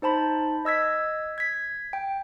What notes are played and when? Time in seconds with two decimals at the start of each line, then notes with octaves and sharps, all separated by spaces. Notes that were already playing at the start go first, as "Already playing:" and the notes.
0.02 D#4 C5 A5 B5
0.65 D#5 E6 G#6 B6
1.38 G#6 B6
1.93 G5